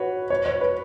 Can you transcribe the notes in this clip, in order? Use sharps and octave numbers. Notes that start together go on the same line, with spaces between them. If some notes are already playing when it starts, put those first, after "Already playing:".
Already playing: F#4 B4 C#5
C#5
C#5
B4